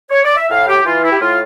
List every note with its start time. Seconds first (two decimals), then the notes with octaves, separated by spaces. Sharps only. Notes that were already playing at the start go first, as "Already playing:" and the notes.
0.10 C#5
0.24 D5
0.36 E5
0.50 A2 F5
0.68 G4
0.85 E3 F4
1.03 E4
1.11 G4
1.20 A2 F4